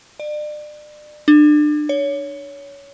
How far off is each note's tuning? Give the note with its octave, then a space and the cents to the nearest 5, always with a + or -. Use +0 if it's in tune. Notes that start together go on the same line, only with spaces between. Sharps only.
D5 +35
D4 +30
C#5 +20